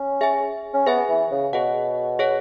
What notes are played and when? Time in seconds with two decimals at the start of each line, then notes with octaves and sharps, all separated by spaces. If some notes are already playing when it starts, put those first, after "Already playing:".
Already playing: C#4
0.21 G#4 E5 G#5
0.74 C#4
0.86 B3 G#4 E5 G#5
1.09 E3
1.31 C#3
1.53 B2 G#4 C#5 F#5
2.19 G#4 C#5 F#5